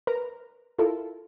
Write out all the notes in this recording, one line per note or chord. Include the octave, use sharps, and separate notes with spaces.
A#4 B4 A#5
E4 F4 A4 A#4